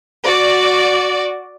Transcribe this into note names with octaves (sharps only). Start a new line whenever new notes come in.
F#4 D5